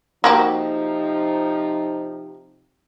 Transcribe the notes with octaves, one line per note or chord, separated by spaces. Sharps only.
C3 F3 A#3 D#4 F#4 G4